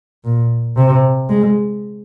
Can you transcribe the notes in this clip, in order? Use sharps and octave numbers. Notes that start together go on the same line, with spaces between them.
A#2
C3
G#3